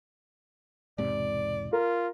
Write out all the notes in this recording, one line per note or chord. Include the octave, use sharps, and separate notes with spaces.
E1 G#2 C3 D5
F4 A#4